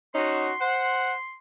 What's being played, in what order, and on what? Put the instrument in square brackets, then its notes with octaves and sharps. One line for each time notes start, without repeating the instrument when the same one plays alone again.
[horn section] C#4 D#4 F#4 [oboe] C6
[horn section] C5 F#5